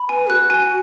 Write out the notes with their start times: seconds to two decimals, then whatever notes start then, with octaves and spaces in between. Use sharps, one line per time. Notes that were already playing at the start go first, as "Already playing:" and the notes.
Already playing: B5
0.09 B4 G#5
0.29 F#4 F#6
0.50 G#5